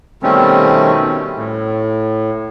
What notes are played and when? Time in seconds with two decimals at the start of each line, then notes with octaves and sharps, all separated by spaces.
0.23 B2 D#3 G3 A3 C4 C#4
1.36 A2